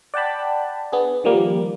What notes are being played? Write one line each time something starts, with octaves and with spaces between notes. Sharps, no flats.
D5 F#5 G5 A5 B5
B3 D4 G#4
D#3 F3 G3 A#3